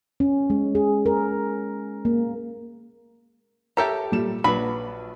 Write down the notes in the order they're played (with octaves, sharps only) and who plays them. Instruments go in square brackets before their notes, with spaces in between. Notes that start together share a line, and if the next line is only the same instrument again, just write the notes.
[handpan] C#4
G#3
G#4
A#4
A#3
[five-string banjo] G4 A4 A#5 [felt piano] A#4 C#5 E5
[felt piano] A#2 G3 E7
[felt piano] A#1 B4 [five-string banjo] F#3 D4 B5